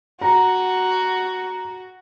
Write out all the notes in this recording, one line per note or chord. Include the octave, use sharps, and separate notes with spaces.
F#4 A#5